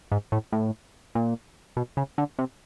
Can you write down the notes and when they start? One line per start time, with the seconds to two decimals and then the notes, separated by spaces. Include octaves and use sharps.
0.11 G#2
0.32 A2
0.52 A2
1.15 A#2
1.76 B2
1.97 C#3
2.18 D3
2.38 C3